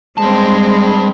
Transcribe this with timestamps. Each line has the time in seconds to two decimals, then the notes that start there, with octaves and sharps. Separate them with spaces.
0.18 G3 G#3 C4 A5